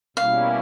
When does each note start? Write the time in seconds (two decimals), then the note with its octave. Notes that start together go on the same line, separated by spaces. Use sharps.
0.17 B2 G3 A#3 C#4 E4 F5